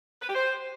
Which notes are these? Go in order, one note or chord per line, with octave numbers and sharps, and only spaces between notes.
B4
G4
C5